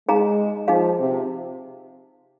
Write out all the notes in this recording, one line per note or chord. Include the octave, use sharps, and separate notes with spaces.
G#3 D#4 G#4 F5 A#5
F3 D#4 G#4 F5
C3